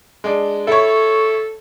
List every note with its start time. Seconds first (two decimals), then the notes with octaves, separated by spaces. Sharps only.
0.24 G#3 D4
0.67 E4 A4 C#5